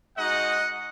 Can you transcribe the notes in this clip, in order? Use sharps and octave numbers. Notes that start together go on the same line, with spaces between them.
G#3 D#4 F#4 D#5 F#5